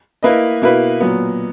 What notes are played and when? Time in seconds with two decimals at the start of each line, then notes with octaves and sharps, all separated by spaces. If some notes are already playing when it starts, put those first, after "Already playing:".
0.23 A#3 E4 B4 D#5
0.62 B2 A#3 E4 B4
1.00 A#2 F#3 B3